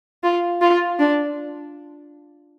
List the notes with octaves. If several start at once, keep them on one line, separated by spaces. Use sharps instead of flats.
F4
F4
D4